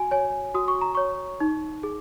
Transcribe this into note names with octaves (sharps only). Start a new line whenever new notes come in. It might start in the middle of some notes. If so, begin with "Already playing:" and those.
Already playing: F#4 G#5
C#5 G#5
F#4 D#6
C#6
A#5
C#5 C#6
D#4
G#4